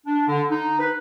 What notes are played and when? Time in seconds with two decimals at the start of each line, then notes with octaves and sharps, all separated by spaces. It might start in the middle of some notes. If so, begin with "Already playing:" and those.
0.06 D4
0.28 D3
0.50 D#4
0.79 B4